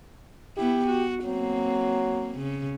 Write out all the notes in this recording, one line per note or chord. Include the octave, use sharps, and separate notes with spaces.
B3 E4 G4
F#4
F#3 A#3 C4
C#3